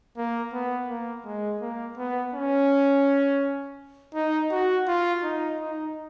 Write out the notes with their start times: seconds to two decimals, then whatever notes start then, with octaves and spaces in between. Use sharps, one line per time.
0.17 A#3
0.53 B3
0.89 A#3
1.25 G#3
1.62 A#3
1.98 B3
2.34 C#4
4.14 D#4
4.51 F#4
4.88 F4
5.23 D#4
5.60 D#4